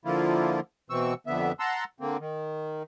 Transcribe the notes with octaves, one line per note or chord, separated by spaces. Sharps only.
D3 F3 A#3 E4 F4
B2 E3 C4 C#6 E6
F2 D3 B3 E5
F#5 A5 A#5 C6 E6
D3 A#3 C4
D#3